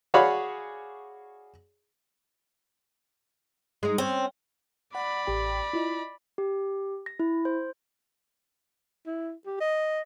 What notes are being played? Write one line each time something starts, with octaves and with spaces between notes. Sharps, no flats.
F#4 G#4 C#5 D5 F5 B5
G#3 D#4
C4 C#4 C#5
D5 F#5 B5
A1 G4 G5
E4 F4 D#5
G4
A#6
E4
C5
E4
G4
D#5